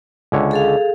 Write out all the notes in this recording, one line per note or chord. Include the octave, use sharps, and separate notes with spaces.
C#2 D3 C#5
G#4 A4 F5